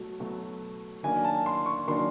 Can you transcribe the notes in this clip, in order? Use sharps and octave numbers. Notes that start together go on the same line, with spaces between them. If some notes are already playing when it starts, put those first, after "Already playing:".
Already playing: B2 F#3 A3
B2 F#3 A3
D#3 F#3 A#3 D4 G#5
A5
C6
C#6
D#3 F#3 A#3 D4 C6